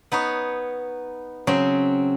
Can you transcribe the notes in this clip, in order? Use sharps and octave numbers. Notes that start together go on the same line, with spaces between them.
B3 D#4 B4 C#5
C#3 F#3 C4 C#4